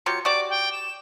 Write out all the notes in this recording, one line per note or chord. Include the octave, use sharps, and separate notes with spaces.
F#3 F4 G4 C#7
F#4 G4 D5 D6
G5
E7